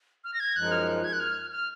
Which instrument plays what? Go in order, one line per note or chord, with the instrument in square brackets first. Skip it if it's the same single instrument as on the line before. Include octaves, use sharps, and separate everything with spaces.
[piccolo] F6
A#6
G#6
[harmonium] F#2 F3 G#3 D#4 [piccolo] F#6
[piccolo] F6
F#6
G#6
F#6
F6
F6